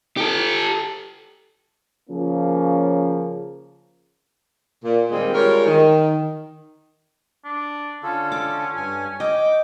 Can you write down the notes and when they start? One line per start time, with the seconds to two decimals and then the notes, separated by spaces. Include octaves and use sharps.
0.17 G4 A4
2.09 C#3 F3 A#3 C#4
4.84 A#2
5.11 A#2 D#3 G3 G#3 A#3 C4
5.34 G3 G#3 F4 A#4 C#5
5.66 D#3
7.44 D4
8.03 D3 C#4 F4 A4
8.32 D6
8.76 G2 G#5
9.20 D#5 G5 D6